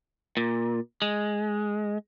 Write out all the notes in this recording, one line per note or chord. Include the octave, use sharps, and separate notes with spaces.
A#2
G#3